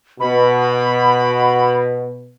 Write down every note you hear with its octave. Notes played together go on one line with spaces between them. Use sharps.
B2 B5